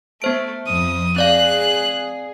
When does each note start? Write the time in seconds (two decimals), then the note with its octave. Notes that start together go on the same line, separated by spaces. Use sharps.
0.22 A3 B3 C5 D7
0.67 F2 D#6
1.16 C4 G#4 D5 F5 F#6